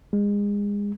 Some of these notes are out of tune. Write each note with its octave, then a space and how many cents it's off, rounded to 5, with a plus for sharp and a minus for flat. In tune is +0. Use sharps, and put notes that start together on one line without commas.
G#3 -30